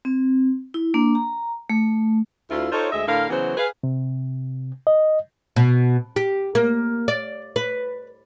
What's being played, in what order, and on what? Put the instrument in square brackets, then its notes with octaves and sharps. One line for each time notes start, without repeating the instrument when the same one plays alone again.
[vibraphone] C4
E4
A#3 D4
A#5
A3
[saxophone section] D2 E4 F4
D#4 F4 A4 C5 C#5
D2 G#3 D#5 E5
A2 D3 A#4 F5
C#3 E3 F#3 B3 F#4 C5
G#4 B4 F5
[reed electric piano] C3
D#5
[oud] B2
G4
A#3
D5
B4